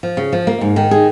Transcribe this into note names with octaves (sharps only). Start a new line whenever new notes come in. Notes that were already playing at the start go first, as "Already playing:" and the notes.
F3
C#3
F3
A#3
G#2
D#3
G#4